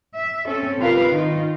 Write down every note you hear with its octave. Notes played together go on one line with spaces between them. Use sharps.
E5
C4 C#4 A4
C3 F4 A#4 B4 F5
D#3 D#4 F4